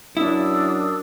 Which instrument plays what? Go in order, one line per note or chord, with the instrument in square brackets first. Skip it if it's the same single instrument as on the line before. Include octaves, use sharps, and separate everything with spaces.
[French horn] F#2 [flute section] D4 D#6 E6 [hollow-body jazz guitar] E4